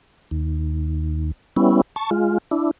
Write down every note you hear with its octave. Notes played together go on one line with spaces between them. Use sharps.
D#2
G3 B3 C#4 E4
A5 C#6
G#3 F4
D4 E4